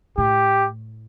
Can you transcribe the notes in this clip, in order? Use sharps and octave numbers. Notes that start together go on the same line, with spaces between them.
A2 G4